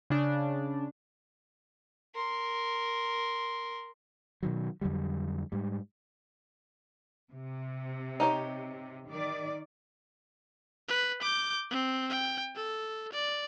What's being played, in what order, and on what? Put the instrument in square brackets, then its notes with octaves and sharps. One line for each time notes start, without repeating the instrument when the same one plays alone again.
[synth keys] C#3 D4
[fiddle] A#4 C6
[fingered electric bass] B2 D#3 F#3
F2 D3 F#3 G3
G#2 G3
[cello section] C3
[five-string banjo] D#4 G4 C#5
[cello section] D#3 D5
[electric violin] B4
D6 G6
C4
G5
A4
D5